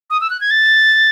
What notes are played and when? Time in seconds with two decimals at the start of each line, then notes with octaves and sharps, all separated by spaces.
0.10 D#6
0.21 E6
0.30 F#6
0.41 G#6
0.51 A6